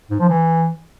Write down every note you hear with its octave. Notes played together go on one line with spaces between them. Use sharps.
G#2
F3
E3